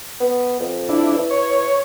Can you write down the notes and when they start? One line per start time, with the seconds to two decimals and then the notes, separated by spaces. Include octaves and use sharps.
0.20 B3
0.59 F2
0.89 D4 E4
1.15 E3
1.30 C#5